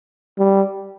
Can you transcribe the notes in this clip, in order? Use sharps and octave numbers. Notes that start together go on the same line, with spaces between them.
G3